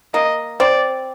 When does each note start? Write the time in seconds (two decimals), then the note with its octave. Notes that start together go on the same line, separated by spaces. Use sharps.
0.14 A#3 D#5
0.60 C4 D5